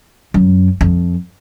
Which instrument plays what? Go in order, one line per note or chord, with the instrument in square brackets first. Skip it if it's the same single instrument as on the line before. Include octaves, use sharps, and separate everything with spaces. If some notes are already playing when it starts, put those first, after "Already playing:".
[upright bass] F#2
F2